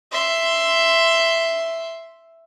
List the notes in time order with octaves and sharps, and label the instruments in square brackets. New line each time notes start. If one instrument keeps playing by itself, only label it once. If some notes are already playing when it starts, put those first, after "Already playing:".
[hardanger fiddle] E5 C6